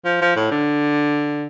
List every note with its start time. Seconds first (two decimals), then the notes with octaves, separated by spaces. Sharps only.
0.05 F3
0.21 F3
0.36 A2
0.51 D3